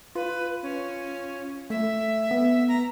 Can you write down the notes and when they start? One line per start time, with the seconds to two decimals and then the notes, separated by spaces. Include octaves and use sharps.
0.15 F4 B4
0.63 C#4
1.70 A3 E5
2.31 B3
2.68 A#5